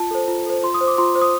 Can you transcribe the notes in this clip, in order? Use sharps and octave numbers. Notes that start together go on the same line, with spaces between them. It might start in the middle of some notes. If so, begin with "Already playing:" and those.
Already playing: F4 A5
A4 C5
F4
A4 C5
F4 C6
D#6
C5
D6
F4 C6
C5
D#6